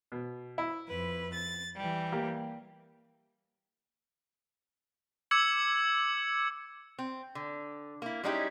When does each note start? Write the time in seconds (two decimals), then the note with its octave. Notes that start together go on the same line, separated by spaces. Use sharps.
0.12 B2
0.58 E4
0.88 F2 B4
1.34 A6
1.76 E3 G3
2.12 A#3 G4
5.31 D6 E6 G#6 C#7 F#7
6.99 C4
7.35 D3
8.02 A#3 E4
8.23 G3 G#3 C#4 D#4 E4 G4